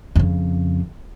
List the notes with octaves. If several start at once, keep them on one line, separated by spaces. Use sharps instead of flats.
F2 C#3